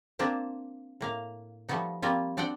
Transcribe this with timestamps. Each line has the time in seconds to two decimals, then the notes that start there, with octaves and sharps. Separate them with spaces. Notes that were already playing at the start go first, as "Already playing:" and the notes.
0.19 A#3 C4 D4 F4 C5
1.01 A2 A#3 F5
1.69 F3 G3 A3 B3 D#4
2.02 F3 G3 A#3 C4 F4
2.37 C4 D4 D5 F#5 G5